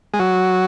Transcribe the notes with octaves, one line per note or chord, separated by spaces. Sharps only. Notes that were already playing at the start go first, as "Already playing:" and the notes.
G#3
F#3